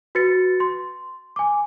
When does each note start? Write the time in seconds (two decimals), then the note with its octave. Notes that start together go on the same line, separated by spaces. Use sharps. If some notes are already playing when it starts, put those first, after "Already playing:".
0.15 F#4 B4 A6 C#7
0.60 C6
1.36 G#5 D6